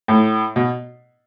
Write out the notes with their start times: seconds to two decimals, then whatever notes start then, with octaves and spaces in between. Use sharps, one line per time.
0.08 A2
0.56 B2